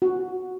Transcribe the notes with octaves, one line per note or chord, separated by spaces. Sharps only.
F#4